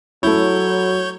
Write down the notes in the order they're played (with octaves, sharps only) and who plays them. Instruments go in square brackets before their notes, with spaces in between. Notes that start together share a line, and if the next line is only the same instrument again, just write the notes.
[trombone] F#3 [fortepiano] A3 E4 [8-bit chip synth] C#5 G6